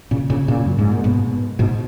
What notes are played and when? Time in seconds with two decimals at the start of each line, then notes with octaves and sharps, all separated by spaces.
0.11 A#2 C#3
0.30 A#2 C#3
0.48 A#2 C#3
0.66 F#2
0.78 G#2
0.92 A#2
1.04 G#2 B2
1.59 G#2 B2